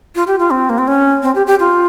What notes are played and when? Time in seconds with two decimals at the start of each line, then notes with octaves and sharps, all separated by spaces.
0.15 F4
0.27 G4
0.40 F4
0.51 C4
0.70 A#3
0.78 C4
0.88 C#4
1.23 C4
1.35 G4
1.47 G4
1.60 F4